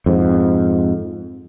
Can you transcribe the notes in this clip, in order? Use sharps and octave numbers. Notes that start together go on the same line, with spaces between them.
F2 G#2